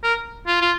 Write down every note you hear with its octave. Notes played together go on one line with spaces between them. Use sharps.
A#4
F4
F4